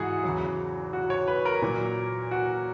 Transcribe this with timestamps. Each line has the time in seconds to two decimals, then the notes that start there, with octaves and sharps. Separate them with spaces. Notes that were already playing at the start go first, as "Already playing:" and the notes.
Already playing: G#2 E3 F#4 G#4
0.23 E2 C#3 F#3
0.93 F#4
1.10 C#5
1.28 B4
1.45 A#4
1.62 A#2 F#3
2.31 F#4